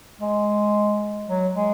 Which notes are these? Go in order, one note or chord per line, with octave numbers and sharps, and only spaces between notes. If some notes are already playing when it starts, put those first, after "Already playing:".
G#3
F#3
G#3